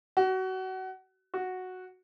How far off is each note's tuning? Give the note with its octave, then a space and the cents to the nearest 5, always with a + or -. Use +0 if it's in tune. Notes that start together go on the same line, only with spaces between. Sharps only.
F#4 +25
F#4 -5